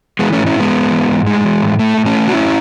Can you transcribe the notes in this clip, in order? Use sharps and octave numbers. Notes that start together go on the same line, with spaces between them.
E3 G#3 B3
G#2 A3 C#4
C#4 E4
G#2 G#3 B3
G#2
E3
G#2
A2 G#3
E3
A2
A2 A3
A2
A3 C#4
A2
F#4
F#2 C#4 E4